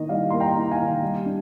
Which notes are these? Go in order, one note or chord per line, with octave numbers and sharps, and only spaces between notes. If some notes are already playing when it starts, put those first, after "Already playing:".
Already playing: D#3 A#3 D#4 D#5
G3 D5 F5
A#3 C6
G5 A#5
D#4
A#5
F5 G#5
D#3
G3
D4